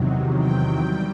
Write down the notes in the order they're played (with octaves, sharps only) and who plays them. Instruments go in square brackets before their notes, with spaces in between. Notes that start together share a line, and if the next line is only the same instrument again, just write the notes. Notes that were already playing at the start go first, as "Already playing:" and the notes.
Already playing: [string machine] E2 C3 D#3 F#3
G5
G3